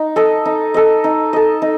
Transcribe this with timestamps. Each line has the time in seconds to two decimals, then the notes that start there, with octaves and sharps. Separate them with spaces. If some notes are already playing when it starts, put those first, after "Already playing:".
Already playing: D#4
0.16 A4 D#5
0.45 D#4
0.74 A4 D#5
1.04 D#4
1.33 A4 D#5
1.62 D#4